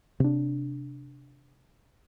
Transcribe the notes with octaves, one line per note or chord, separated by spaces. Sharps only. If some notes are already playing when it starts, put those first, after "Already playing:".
C3 D4